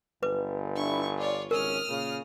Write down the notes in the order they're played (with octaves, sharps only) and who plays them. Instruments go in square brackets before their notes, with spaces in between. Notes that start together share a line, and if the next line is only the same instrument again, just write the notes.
[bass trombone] G1 [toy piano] B4 D6
[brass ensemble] D4 E4 [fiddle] C#6
[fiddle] F4 C#5 [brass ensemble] D5
[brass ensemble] G#1 C#2 C#4 [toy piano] A#4 [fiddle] D#6 F6
[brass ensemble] A#2 C#3